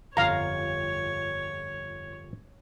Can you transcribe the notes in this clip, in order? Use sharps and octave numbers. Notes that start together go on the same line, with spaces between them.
G1 F2 F4 C#5 F5 A#5